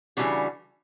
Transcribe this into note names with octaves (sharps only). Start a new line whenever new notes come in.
C#3 E3 G3 D4 F#4